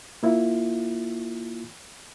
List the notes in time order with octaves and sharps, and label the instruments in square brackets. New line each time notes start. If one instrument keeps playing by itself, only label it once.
[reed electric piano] A#3 E4 F4